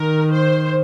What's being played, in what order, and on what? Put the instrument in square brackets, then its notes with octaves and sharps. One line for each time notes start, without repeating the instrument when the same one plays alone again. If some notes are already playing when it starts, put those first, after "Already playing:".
Already playing: [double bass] D#3 [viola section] A#4
[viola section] C5